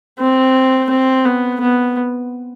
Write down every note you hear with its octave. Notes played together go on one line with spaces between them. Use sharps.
C4
C4
B3
B3